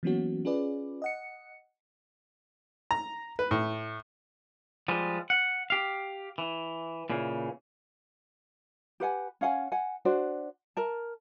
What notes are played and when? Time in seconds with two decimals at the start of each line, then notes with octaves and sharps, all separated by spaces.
0.03 E3 F#3 A#3 B3 C#4 F#4
0.45 C#4 F4 G#4 B4 D5
1.02 D#5 F#5 C#7
2.91 A#5
3.39 B4
3.51 A2
4.88 F3 G3 G#3
5.30 F#5
5.70 G4 F5
6.38 E3
7.10 A#2 C#3 E3
9.00 G4 B4 F#5 G#5
9.41 C#4 F5 F#5 G#5
9.72 F#5 G#5
10.05 D4 F#4 C5
10.77 A#4 A5